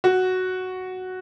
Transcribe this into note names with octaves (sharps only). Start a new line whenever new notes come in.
F#4